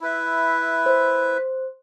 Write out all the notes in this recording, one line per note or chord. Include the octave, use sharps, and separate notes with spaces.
E4 B4 E5
C5